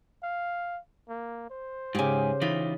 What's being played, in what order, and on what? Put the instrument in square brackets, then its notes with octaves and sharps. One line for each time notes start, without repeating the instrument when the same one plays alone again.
[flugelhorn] F5
A#3
C5
[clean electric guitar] G#2 G#5 [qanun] C#3 G4
[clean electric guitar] E3 D#4 F4 [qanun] B5